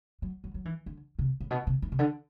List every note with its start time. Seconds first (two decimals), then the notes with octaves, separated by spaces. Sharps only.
0.22 F#3
0.44 F#3
0.54 F#3
0.65 E3
0.86 D3
1.19 C3
1.41 A2
1.51 B2
1.67 C3
1.82 E3
1.92 C3
1.99 D3